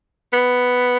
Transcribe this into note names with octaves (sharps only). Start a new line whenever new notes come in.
B3